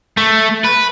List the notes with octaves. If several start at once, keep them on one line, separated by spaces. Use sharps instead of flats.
A3
B4